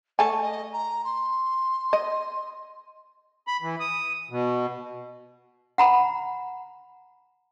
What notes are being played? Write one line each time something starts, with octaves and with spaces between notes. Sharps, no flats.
A3 A4 D5 G#5
D#5
A#5
C6
D#5
B5
E3
D#6
B2
F#5 A#5 B5